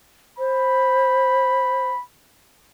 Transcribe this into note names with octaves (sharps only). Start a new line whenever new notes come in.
C5 B5